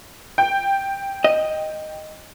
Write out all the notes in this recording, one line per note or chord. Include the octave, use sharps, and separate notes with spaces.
G5
D#5